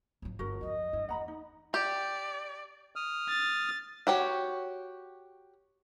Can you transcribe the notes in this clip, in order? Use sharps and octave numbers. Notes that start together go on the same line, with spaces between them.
G#1 F3
G1 F#4 A#4
F2 F3 D#5
G2 E4
E2 F#5 A#5 B5
D#4
G4 D5
D#6 F6
A6
F#4 G4 C#5